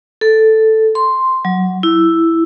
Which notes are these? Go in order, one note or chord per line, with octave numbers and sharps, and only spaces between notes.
A4
C6
F#3
E4